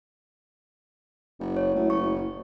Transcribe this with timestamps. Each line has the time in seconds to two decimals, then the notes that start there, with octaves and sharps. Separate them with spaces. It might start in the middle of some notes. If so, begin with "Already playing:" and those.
1.40 F#1
1.57 C#5
1.75 F#2 A3 E4
1.90 F#1 C#6